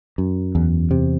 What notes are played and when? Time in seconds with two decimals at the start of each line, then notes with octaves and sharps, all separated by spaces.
0.18 F#2
0.55 E2
0.91 C3